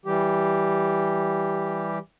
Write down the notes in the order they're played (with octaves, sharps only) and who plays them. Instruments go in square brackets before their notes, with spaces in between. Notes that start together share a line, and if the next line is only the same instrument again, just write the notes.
[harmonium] E3 G3 G4